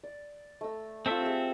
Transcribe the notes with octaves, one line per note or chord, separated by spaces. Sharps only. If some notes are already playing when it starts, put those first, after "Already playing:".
D5
A3 A#5 E6
A3 C4 F4 A4 E5
G4 G#4